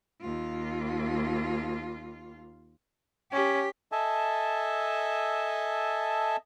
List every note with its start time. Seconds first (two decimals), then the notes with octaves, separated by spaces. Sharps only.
0.21 D#2 F4
3.32 C#4 G4
3.92 A4 D#5 E5 G#5 A5